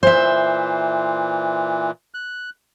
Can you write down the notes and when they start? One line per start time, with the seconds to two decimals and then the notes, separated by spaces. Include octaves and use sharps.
0.03 A#2 E3 C5 E5
2.14 F#6